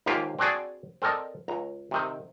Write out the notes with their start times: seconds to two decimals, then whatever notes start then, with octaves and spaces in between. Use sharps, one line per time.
0.06 D#2 G#2 A#3 F4 G4 F5
0.39 C4 D4 F#4 G#4 D5
1.02 C4 A4 A#4 D5 D#5
1.48 C#2 A#5
1.91 C3 D#3 C4